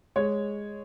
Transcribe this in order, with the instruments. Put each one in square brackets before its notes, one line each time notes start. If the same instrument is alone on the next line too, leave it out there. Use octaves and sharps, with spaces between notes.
[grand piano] G#3 C#5